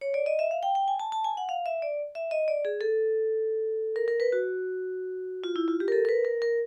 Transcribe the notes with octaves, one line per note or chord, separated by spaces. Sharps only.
C#5
D5
D#5
E5
F5
G5
G5
G#5
A5
A5
G#5
F#5
F5
E5
D5
E5
D#5
D5
G#4
A4
A#4
A#4
B4
F#4
F4
E4
F4
G4
A#4
A4
A#4
B4
A#4
A#4